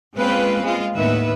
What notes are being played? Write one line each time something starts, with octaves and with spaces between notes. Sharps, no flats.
G#3 A#3 C4 C#4 F4 B4
G#3 F4
D#2 A2 D#3 B3 B4 E5